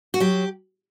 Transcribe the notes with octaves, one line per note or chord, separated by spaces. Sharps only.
F#4
F#3 G4